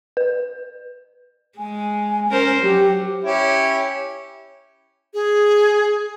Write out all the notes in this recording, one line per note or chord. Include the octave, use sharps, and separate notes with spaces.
B4
G#3 G#5
C#4 A#4 C5
F#3 G4
C#4 E4 G4
G#4